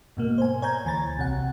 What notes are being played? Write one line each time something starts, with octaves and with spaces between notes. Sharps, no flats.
G#2 B2 A#3
C5 G#5
C#5 G#5 A#5 G6 G#6
D2 E3 G#5 A#5 A6
B1 C3 F#5